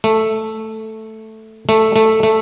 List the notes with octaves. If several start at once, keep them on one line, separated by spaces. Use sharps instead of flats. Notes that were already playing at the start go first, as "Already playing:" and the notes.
A3
A3
A3
A3